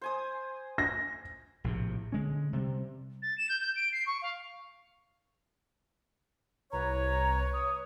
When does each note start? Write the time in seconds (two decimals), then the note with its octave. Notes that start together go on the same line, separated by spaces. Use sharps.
0.01 C5 G#5 D#6
0.78 A#6
1.64 A#1 A2 C3
2.12 D3 G#3 C#4
2.53 C3 G3
3.22 A6
3.37 E7
3.49 G6
3.61 G6
3.75 D7
3.92 C7
4.06 C#6
4.22 F5
6.72 C2 B4 C#5 A#5
7.53 D#6